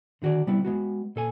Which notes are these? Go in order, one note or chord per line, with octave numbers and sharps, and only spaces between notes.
D3 D#3 F#4 G#4 D5
C3 G3 B3 E4
G#3 B3 F#4
A#2 A4 G#5